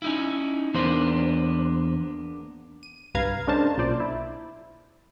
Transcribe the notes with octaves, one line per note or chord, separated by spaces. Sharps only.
C#4 D#4 E4
E2 A#3 B3 D4 C5
D#7
C2 G2 B4 F5 A#5 G#6
G#3 C#4 D4 A#4 C5 A5
B1 A#2 C5 D5
E4